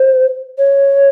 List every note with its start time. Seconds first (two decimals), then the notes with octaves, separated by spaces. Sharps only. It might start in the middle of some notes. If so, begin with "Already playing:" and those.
Already playing: C5
0.58 C#5